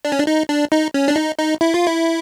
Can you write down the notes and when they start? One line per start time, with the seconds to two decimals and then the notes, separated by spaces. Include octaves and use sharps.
0.05 D4
0.12 C#4
0.19 D4
0.27 D#4
0.49 D4
0.72 D#4
0.94 C#4
1.08 D4
1.16 D#4
1.39 D#4
1.61 E4
1.74 F4
1.87 E4